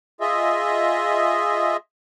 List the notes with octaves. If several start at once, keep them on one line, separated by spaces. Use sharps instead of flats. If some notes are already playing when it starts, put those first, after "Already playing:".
F4 G#4 D#5 E5